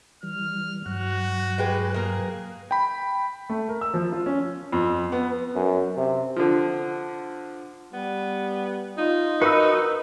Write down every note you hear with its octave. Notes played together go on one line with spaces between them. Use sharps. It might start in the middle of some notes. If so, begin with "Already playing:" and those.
E3 G3 F6
G2 F#3 F#4 F#6
G#3 G4 B4
A#3 G#4 A#4
G5 B5
A3
A#4
E6
F3
F4
C#4
F2
B3
F#2
C3
D3 F3
G3 B3
D#4 F4
F#4 A#4 B4 D#5 E6